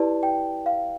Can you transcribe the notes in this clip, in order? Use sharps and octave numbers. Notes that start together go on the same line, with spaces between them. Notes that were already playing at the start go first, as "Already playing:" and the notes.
Already playing: E4 G4 B4 D5 A5
G5
F5